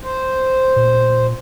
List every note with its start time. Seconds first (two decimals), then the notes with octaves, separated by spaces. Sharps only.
0.03 C5
0.76 A#2